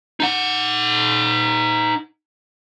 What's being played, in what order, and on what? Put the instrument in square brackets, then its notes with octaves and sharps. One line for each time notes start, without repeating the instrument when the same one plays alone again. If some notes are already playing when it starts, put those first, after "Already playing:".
[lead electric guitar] D#4 F#5